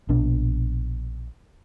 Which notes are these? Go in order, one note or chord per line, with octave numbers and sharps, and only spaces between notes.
A#1 B2 D4